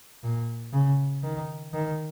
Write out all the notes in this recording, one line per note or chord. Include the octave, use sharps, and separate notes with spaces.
A#2
C#3
D#3
D#3